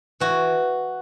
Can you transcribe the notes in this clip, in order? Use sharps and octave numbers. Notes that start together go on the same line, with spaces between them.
E3 F#4